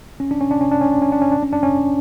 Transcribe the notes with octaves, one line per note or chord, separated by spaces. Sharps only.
C#4
D4
C#4
D4
C#4
D4
C#4
D4
C#4
D4
C#4
D4
C#4
D4
C#4